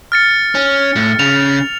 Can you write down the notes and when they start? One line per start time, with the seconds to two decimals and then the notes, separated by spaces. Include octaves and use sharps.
0.12 F6 A6 C#7
0.55 C#4
0.96 A2
1.19 C#3 F7